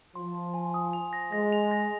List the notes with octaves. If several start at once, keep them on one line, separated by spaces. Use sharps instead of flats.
F3 C6
C6
G#5
D#6
F7
A#6
G#3 A#6
F7
A#6